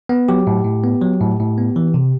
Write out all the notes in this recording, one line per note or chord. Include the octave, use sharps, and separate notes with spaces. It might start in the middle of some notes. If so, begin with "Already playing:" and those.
B3
F#3 G4
A2
A2
B3
F#3
A2
A2
B3
E3
C3